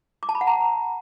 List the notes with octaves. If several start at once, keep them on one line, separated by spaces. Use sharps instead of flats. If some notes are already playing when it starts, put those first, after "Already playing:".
D6
A5
B5
F#5
A#5